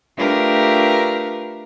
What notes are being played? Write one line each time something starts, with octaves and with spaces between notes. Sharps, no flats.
A3 D4 F4 G4 A#4 B4